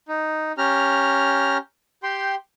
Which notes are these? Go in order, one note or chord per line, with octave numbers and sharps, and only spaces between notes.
D#4
C#4 G4 A#5 F6
G4 G5 C6